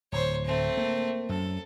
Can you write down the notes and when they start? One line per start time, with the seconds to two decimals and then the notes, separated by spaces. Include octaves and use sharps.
0.12 D1 C5 C#5
0.46 A3 C4
0.77 A#3
1.29 F#2 A4